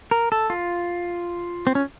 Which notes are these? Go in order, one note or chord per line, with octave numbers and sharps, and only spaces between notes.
A#4
A4
F4
C4
C#4